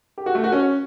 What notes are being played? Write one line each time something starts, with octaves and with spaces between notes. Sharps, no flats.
G4
F#4
A3
F#4
C#4